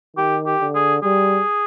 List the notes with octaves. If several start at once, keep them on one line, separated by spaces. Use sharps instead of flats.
D#3 G4
G4
D3
G#4
G3 G#4